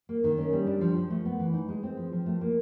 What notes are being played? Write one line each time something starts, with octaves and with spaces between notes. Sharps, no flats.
A#3
D#3
C#4
G3
D4
F3
F3
A3
B3
E3
D#4
G#3
C4
F3
F3
A3
A#3